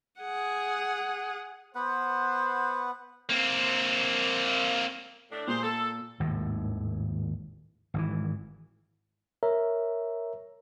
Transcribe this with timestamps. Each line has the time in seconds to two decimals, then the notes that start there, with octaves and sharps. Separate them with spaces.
0.20 G#4 F#5
1.75 B3 B4 C5 F#5
3.29 A#3 C4
5.32 A2 D4
5.48 A#2 G4 G#4 C5
5.63 A4
6.20 G#1 D#2 A2
7.94 G#1 B2 E3
9.43 A#4 C#5 E5 A#5